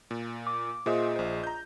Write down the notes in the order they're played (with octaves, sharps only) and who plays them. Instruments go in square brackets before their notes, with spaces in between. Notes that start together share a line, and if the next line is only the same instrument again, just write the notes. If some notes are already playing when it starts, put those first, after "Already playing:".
[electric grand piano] A#2
[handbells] D6
[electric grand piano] A#2 C5 E5 [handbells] F4 G#4 D#5
[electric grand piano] A#1 C5
A#5 G6